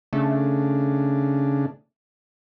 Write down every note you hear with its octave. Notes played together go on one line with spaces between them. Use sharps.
C#3 A3 D4